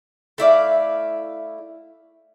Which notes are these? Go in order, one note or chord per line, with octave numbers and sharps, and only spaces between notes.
A3 E4 D5 F5